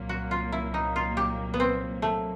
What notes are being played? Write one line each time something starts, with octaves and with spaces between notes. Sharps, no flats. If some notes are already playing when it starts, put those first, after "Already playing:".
Already playing: C2 A#2 F#3 A#3
F#4
F4
E4
D#4
F4
G4
B3
C4
A3